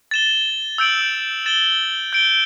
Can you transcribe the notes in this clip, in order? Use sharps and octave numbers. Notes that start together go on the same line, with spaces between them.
A6 E7 G7
E6 G6 D7 F#7
A6 E7 G7
G6 D7 G7